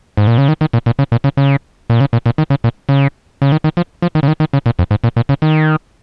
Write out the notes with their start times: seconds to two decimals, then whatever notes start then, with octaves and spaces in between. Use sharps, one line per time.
0.17 G#2
0.27 A#2
0.38 C#3
0.48 D#3
0.61 D#3
0.73 A#2
0.86 A#2
0.99 C#3
1.12 A#2
1.24 C#3
1.37 C#3
1.90 A#2
2.01 C#3
2.13 A#2
2.26 A#2
2.38 D#3
2.50 C#3
2.64 A#2
2.89 C#3
3.42 C#3
3.52 D#3
3.64 D#3
3.77 F3
4.02 F3
4.15 D#3
4.23 C#3
4.28 D#3
4.40 D#3
4.53 C#3
4.66 A#2
4.79 F2
4.91 G#2
5.04 A#2
5.16 A#2
5.29 C#3
5.42 D#3